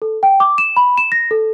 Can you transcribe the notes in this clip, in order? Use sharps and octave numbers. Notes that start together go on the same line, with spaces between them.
A4
G5
D6
E7
B5
E7
A#6
A4